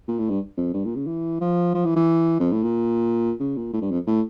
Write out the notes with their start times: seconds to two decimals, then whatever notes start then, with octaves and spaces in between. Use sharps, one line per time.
0.08 A#2
0.19 A2
0.29 G2
0.58 F2
0.74 G2
0.85 A#2
0.96 C#3
1.07 E3
1.41 F3
1.74 F3
1.85 E3
1.96 E3
2.40 F2
2.52 A2
2.63 A#2
3.40 C#3
3.57 A#2
3.74 A2
3.82 G2
3.91 F2
4.07 A2